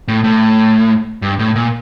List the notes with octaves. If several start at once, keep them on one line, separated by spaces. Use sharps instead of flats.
A2
A2
G2
A2
A#2